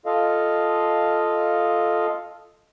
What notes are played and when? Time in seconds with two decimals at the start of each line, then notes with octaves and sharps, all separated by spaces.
0.06 F4 A4 D#5 F5